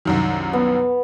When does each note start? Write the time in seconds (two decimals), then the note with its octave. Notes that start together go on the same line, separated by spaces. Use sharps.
0.05 C2 F#2 D#3
0.53 B3